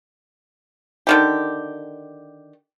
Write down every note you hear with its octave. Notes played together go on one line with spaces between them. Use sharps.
D3 D#3 G4